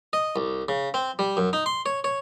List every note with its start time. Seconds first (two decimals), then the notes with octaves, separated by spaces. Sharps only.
0.13 D#5
0.36 C2
0.69 C#3
0.94 C4
1.19 G3
1.37 F#2
1.53 D#4
1.66 C6
1.86 C#5
2.04 C#5